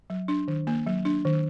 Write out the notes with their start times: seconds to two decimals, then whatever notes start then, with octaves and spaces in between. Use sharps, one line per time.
0.10 F#3
0.28 D4
0.48 D#3
0.67 A#3
0.87 F#3
1.05 D4
1.25 D#3